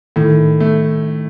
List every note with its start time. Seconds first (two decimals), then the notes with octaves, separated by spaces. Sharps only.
0.16 A2 D#3
0.60 A3